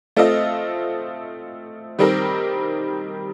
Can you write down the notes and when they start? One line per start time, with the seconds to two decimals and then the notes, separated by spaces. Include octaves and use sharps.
0.16 A3 C4 F4 A4 D#5
1.99 D#3 G3 C4 G4 A#4